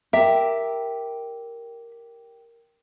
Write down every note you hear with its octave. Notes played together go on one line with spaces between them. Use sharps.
G4 A#4 E5